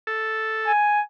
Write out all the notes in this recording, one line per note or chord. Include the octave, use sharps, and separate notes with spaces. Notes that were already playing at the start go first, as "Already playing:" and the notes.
A4
G#5